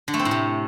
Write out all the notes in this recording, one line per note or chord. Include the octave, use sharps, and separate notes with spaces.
D3
A3
C4
A2
C3